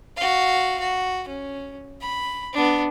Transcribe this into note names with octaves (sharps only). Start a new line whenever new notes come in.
F#4 F5
F#4
C#4
B5
B3 D4